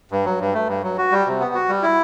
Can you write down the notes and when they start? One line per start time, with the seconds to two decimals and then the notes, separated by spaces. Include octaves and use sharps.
0.11 G2
0.25 F#3
0.40 G2
0.54 A3
0.68 G2
0.83 F#3
0.98 F#4
1.12 G3
1.26 C3
1.40 B3
1.54 F#4
1.69 G3
1.83 E4